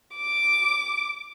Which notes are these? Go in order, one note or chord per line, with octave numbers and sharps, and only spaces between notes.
D6